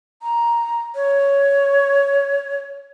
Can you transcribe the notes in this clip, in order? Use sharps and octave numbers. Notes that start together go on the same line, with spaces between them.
A#5
C#5